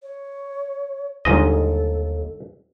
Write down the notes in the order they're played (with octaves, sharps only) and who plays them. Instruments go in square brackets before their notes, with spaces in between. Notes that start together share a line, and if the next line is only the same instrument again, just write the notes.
[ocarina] C#5
[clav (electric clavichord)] G1 G#2 D#5 [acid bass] D#2 [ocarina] A4